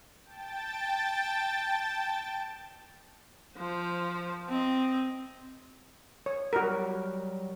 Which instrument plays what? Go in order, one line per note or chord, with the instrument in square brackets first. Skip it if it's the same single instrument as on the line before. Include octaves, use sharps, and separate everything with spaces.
[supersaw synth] G5 A5 A6
[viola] F3 C5
C4 D#5
[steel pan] C#5
[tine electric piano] F#3 G3 [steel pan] F#4 A#4